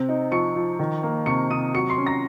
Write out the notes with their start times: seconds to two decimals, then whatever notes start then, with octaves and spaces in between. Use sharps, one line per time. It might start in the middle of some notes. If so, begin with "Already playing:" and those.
Already playing: C3 C4
0.09 D#4
0.32 F3 C#6 C#7
0.56 F3
0.79 D#3
1.03 A#3
1.26 C3 C#6 C#7
1.50 C3 D#6 D#7
1.74 F#3 C#6 C#7
1.89 C6 C7
1.98 C#4
2.06 A#5 A#6